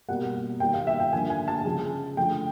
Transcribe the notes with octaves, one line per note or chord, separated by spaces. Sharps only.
B2 G3 A#3 F#5
D#3 G3 A#3 G5
F5
E5
G5
D3 F3 A#3 G#5
G#5
A5
C#3 F3 G#3
D3 F3 A3 G5